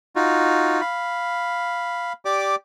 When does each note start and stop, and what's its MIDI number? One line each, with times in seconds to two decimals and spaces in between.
0.16 0.81 63
0.16 0.81 65
0.16 0.81 66
0.81 2.13 77
0.81 2.13 83
2.25 2.55 67
2.25 2.55 74
2.25 2.55 86